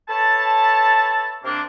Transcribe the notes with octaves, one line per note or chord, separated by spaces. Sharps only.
A4 B4 C#5 E5 A5
C3 A#3 D4